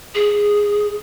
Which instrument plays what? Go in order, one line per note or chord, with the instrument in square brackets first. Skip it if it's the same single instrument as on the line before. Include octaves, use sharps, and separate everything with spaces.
[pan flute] G#4